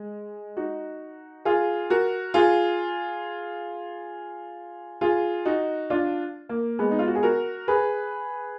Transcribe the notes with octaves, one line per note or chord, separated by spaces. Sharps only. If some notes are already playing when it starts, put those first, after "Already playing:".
Already playing: G#3
D#4 F#4
F4 G#4
F#4 A#4
F4 G#4
F4 G#4
D#4 F#4
D4 F4
A#3
G#3 B3
D#4
F4
F#4
G#4
F#4 A#4
G#4 B4